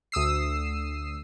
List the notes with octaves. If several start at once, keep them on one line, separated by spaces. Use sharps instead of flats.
D2 D#6 E6 C7